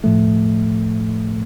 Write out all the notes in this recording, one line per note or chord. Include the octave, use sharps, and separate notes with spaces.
A2 F3 A3